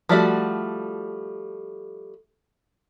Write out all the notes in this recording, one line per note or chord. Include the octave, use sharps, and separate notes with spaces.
F3 G3 A3 F#4